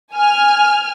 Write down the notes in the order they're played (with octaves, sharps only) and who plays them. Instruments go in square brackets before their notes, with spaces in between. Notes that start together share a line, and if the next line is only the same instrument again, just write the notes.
[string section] G#5 F6